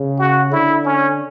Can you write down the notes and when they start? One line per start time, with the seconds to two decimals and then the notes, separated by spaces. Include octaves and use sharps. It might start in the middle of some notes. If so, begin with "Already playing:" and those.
Already playing: C#3
0.19 F#4
0.52 D3 E4
0.85 C#4